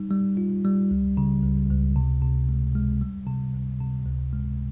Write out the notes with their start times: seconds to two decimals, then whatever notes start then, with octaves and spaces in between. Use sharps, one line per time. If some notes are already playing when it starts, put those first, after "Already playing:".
Already playing: G3 D#4
0.11 G3
0.37 F4
0.65 G3
0.91 C#2
1.17 C#3
1.43 C#2
1.70 C#2
1.96 C3
2.22 C3
2.49 G#3
2.75 G#3
3.01 G3
3.27 C3
3.53 C#2
3.80 C3
4.06 C#2
4.33 G#3